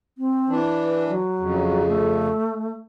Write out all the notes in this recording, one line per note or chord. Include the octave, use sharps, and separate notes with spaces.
C4
E3 D4
B4
F#3
F2 C#3
A3